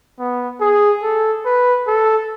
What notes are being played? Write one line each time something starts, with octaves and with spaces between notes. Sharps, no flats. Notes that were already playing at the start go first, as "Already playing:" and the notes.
B3
G#4
A4
B4
A4